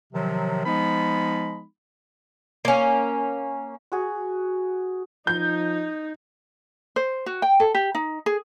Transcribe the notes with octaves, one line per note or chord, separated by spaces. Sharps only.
C3 D#3 F3 F#3
F3 G#3 B3 D#4 B5
A#3 C#4
F#4 G#4
F3 D#4 G6
C5
F#4
G5
A4
G4
D#4
G#4